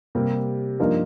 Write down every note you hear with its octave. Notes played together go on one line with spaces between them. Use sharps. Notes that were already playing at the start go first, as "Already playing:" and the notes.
C3 G3 A#3
G2 F3 A#3 D#4 A#4